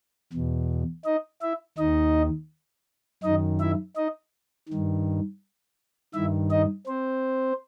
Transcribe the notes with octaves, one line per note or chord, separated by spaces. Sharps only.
E2 B2
D#4 D#5
E4 E5
D#2 D#3 D#4 D#5
F#2 D#3 D#4 D#5
E4 E5
D#4 D#5
G2 D#3
G2 D#3 E4 E5
D#4 D#5
C4 C5